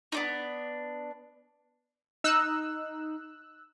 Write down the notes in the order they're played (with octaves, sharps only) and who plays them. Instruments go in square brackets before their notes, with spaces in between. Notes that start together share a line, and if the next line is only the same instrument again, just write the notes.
[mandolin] B3 D4 D#4
[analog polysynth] D#4 [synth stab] E6 F#6